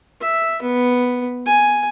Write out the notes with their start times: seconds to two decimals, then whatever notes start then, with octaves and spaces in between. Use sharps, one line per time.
0.21 E5
0.62 B3
1.46 G#5